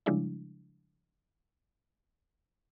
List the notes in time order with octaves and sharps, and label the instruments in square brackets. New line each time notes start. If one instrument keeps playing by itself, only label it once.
[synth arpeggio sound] C#3 F3 G3 G#3 D4 E4